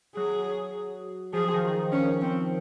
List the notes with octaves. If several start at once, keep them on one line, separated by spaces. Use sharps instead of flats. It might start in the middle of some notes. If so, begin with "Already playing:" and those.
F#3 G#4
F3 G#4
D#3
D#3
C#4
C4